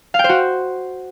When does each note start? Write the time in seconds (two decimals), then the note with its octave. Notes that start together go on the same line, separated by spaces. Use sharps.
0.14 F5
0.19 G5
0.24 C5
0.29 F#4